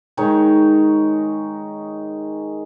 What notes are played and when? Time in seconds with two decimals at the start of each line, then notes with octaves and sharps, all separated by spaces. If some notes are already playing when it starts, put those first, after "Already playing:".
0.17 D#3 G#3 D#4 C#5